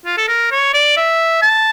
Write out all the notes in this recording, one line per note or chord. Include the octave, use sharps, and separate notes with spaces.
F4
A4
A#4
C#5
D5
E5
A5